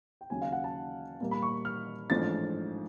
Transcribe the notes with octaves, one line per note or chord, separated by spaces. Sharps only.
G5
D#2 C#3 F#3 G#5
F5
F#5
A5
A#2 G3 A#3
B5
C#6
F6
A1 G#2 F3 A3 D4 A6